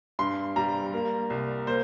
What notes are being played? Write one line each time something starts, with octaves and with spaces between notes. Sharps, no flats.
G2 C6
G3 A#5
A#3
C2
A#3 C5